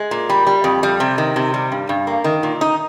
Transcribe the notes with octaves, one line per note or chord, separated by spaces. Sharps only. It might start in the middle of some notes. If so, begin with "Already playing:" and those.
Already playing: G#3
A#2
G3
G3
F2
G3
C3
D#3
C3
G3
G2
G2
A#3
D#3
A#2
D#4